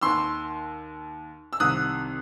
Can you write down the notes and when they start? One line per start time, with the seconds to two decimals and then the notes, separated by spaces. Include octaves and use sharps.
0.01 D#2 D#3 C6 E6
1.53 E6
1.60 C2 C3 D#3 D#6 F#6